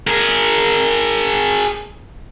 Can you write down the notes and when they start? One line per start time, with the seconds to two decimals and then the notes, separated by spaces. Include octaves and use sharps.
0.07 G#4 A#4